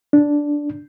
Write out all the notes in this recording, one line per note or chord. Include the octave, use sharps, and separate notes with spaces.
D4